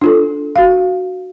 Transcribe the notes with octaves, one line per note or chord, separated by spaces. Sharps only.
D4 F4 A4
F#4 F5